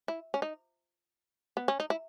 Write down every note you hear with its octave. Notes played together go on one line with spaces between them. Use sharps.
E4
C#4
D#4
B3
C#4
D#4
E4